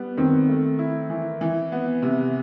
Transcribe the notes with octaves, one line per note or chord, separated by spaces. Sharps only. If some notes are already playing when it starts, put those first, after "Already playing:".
Already playing: G3 B3
D#3 C4
A3
E4
E3
E3
B3
C3